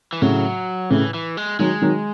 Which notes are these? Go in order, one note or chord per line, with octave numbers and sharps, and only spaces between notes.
E3
A2 C#3 F#3
A2 C#3 E3
E3
G#3
D#3 F#3 G#3
D#3 F#3